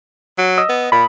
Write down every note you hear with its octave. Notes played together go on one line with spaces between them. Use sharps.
F#3
D#5 D#6 E6
B3
A#2 B5